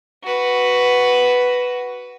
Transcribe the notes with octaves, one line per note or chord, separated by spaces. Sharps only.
F#4 B4